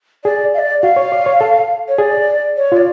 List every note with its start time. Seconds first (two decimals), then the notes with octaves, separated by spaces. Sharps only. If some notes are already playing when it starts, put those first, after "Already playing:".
0.24 G#4 D5
0.54 F5
0.59 D5
0.82 F#4 F5
0.96 C#5
1.12 D5
1.26 C#5
1.41 A4
1.88 C#5
1.98 G#4 D5
2.57 C#5
2.72 F4 D5